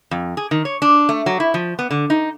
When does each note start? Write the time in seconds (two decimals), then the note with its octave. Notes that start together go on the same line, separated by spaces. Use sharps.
0.11 F2
0.37 G#4
0.51 D#3
0.65 C#5
0.82 D4
1.09 A3
1.26 F#3
1.40 E4
1.54 F3
1.79 B3
1.91 D3
2.10 D#4